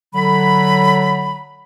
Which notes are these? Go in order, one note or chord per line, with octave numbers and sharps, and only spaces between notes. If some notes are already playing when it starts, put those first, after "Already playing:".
D3 F#3 B5